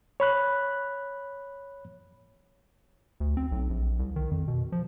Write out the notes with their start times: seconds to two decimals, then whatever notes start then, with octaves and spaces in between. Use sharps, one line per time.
0.20 C#5 B5 F#6
3.20 D2
3.37 C4
3.52 B1
3.70 A#1
3.99 C2
4.16 D#3
4.31 F2
4.48 B2
4.72 F3